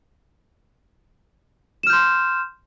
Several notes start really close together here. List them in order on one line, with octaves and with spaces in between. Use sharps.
E7 F6 G6 C6